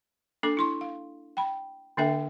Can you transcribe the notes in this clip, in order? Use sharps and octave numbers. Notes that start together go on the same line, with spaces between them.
A#3 D4 A4 D6
E4 C6 C#6
F5
G5 B5
D3 A#3 D4 A4 E5 G5